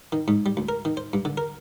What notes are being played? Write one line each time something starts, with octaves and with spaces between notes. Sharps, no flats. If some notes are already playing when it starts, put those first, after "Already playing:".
D#3
G#2
G3
D2
A#4
D#3
C5
G2
D3
A#4